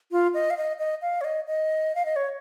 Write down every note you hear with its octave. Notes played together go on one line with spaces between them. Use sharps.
F4
D#5
F5
D#5
D#5
F5
C#5
D#5
D#5
F5
D#5
C#5